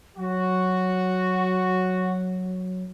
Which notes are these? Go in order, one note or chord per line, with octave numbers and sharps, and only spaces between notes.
F#3 F#4